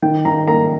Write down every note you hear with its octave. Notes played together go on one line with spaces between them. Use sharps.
D#3 G5
D#3 A#5
A#3 A#5